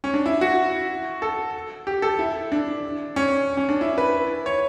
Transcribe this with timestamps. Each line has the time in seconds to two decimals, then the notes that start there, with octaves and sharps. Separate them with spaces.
0.04 C#4
0.14 D4
0.26 E4
0.41 F#4
1.22 A4
1.87 G4
2.02 A4
2.19 E4
2.52 D4
3.16 C#4
3.57 C#4
3.69 D4
3.81 E4
3.98 B4
4.46 C#5